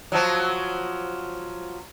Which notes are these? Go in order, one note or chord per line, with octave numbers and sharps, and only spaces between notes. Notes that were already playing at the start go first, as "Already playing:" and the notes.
F3 F#3